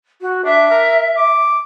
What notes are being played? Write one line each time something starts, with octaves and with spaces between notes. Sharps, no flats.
F#4
D4 E5
A#4
D6